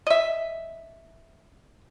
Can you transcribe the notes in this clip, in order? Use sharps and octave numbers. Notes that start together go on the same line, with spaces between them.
D#5 E5